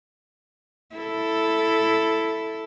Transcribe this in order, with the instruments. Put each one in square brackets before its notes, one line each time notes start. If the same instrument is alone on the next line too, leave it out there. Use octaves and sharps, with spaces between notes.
[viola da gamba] E4 A4